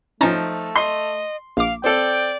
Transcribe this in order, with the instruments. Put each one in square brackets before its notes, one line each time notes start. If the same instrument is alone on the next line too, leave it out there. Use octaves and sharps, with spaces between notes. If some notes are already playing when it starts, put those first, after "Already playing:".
[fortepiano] F3 D#4 [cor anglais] A3 [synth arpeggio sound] C#4 A5 A#5
[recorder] D#5 [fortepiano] C6
[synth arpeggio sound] A#1 D6 [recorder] F5
[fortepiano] C4 A4 [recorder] D5 [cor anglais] G5